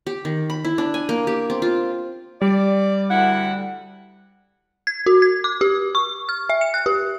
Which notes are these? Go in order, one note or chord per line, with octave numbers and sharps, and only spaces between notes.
G4
D#3
B5
E4
D4
G#5
A#3
G4
C4
F4
G3 D5
D2 E4 F#5
G#6
F#4
G#6
D6
G4
C#6
F6
E5
C#7
F#6
G4